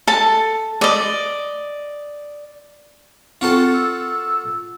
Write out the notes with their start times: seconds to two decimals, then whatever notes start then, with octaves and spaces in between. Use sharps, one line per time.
0.07 A4 A5
0.81 D5 D#5
3.41 C4 F4 F#4 A4
3.74 E6